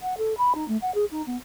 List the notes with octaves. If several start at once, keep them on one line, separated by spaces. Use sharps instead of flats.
F#5
A4
B5
D#4
A3
F#5
G#4
D#4
B3